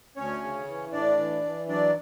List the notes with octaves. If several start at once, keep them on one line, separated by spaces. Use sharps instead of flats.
D2 C#4 C#5
C#3
E3
A2 D4 D5
E3
E3
F#3 D4 D5